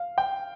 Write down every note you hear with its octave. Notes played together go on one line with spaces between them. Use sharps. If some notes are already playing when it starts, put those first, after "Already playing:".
Already playing: F5
G5